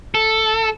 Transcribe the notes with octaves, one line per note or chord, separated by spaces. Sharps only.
A4